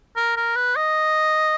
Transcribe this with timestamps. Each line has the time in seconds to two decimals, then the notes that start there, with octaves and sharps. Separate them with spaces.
0.16 A#4
0.36 A#4
0.56 B4
0.76 D#5